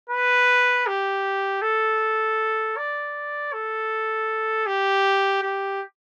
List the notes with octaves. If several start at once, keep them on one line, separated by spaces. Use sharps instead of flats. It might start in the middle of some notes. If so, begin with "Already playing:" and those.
B4
G4
A4
D5
A4
G4
G4